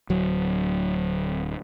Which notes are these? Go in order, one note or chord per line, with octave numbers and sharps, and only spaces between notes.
D1 F#3